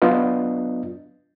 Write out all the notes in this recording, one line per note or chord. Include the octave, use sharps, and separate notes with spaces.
F#3 B3 D4 F4 D#5